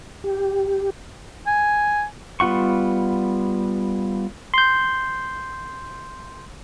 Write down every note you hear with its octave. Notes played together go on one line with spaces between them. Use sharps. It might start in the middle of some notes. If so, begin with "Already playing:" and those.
G4
G#5
G3 B3 F4 F#5 C#6
C6 G6